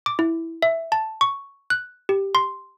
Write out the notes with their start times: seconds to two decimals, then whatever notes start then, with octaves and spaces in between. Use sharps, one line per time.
0.06 D6
0.19 E4
0.62 E5
0.92 A5
1.21 C#6
1.70 F#6
2.09 G4
2.35 C6